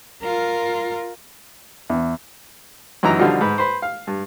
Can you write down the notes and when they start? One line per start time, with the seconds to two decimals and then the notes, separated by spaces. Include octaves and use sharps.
0.21 F4 A#4
1.90 E2
3.03 F#2 E3 D#4 A#5
3.19 B2 D3 F3 G3 D#4 F4
3.41 G#2 B4
3.58 B4 C5
3.82 F5
4.07 G2